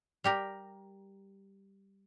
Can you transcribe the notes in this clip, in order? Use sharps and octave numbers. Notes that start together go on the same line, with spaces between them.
G3 G4 A#4